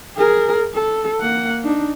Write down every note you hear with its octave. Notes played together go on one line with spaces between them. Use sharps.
G#4 A#4
A4
A#3 F#5
D4 D#4